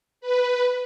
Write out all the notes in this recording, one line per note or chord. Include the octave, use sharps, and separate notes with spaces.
B4